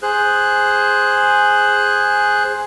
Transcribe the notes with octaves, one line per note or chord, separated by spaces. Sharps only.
G#4 C5 F#6